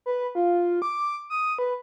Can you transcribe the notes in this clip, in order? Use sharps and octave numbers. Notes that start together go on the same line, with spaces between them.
B4
F4
D6
D#6
B4